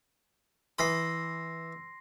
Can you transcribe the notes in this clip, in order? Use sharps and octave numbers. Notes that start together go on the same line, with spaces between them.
E3 B5 C6 D#6 A#6 C7